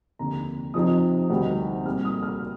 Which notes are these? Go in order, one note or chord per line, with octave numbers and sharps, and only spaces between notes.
F1 D#2 D3 A#5
F2 C3 F3 C4 D#4 D#6
D2 C3 D#3 G3
C2 A#2 G3 F6
D#6
F6